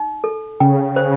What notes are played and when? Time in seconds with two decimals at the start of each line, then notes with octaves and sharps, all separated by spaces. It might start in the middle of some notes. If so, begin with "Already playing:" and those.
Already playing: D#4
0.24 A4
0.60 C#3 G5
0.96 C5